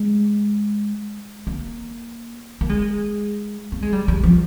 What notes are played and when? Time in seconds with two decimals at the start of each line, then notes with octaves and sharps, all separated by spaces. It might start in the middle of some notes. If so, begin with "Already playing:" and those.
Already playing: G#3
1.47 A#3
2.61 A#3
2.69 G#3
3.72 A#3
3.82 G#3
3.93 G3
4.08 G3
4.23 F3